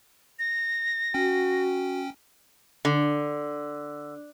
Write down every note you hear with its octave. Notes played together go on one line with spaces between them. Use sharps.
A#6
C#4 F#4 G5
D3